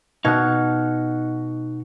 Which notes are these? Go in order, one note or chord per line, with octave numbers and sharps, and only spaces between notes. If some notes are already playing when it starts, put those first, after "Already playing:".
B2 D#4 F#5 F6 G#6